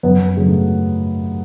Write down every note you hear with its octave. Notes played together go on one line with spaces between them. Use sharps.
F#2 B3
C#3 F#3 A3